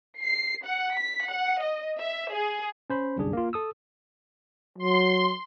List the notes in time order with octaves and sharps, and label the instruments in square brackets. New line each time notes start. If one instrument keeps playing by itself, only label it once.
[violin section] C7
F#5
B6
F#5
D#5
E5
G#4
[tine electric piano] C#4 C5 B5
G1 C2 F#2 D4 G#4
A#3 F4
A4 D#6 E6
[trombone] F#3 [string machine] C6